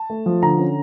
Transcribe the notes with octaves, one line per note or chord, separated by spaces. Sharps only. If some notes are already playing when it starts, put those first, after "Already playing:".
Already playing: A5
A3
F3
D3 A#5
C#4